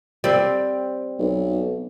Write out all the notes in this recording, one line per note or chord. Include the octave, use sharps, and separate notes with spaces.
G3 C4
B1